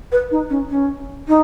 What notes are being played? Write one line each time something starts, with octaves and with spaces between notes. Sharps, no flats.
B4
D#4
C#4
C#4
D#4